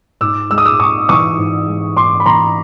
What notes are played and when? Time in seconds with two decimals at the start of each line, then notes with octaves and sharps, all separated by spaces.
0.21 G#2 D6 E6
0.50 G#3 E6
0.58 D#6
0.65 D6 E6
0.79 G#2 C#6 D#6
1.09 E3 C#6 D#6
1.38 G#2
1.68 G#3
1.97 G#2 C6 D6
2.20 B5
2.26 E3 A#5 C6